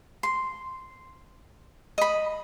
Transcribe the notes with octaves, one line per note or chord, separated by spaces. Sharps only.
C6
D#5 B5